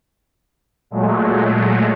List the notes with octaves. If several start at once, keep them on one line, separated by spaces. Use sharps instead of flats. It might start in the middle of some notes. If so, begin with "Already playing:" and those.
A#2 F#3 G#3 A3